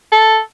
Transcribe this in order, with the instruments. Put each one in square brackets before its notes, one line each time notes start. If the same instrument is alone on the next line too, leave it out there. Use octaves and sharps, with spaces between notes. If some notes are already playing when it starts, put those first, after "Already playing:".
[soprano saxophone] A4